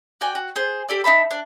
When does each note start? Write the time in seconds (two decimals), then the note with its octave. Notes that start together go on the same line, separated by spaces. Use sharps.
0.21 F#4 D5 G5 G#5
0.35 F#4
0.56 G#4 C5
0.89 G4 A4 D5
1.04 D#4 E5 A5 B5
1.31 D4